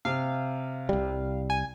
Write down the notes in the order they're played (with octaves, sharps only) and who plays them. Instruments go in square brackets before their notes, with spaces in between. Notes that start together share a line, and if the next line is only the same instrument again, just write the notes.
[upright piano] C3 [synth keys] F5
[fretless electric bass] C2 G3
[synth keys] G#5